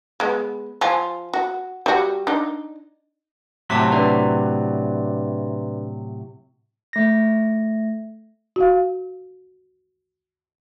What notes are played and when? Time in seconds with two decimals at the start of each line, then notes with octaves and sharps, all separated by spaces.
0.20 G#3 B3
0.81 F3 G#5
1.34 F#4
1.86 G3 F#4
2.27 D4 D#4
3.70 A2 C3 F#3 A5 D6 B6
3.92 D4 B4 D5
6.93 A3 A#6
8.56 F#4 F5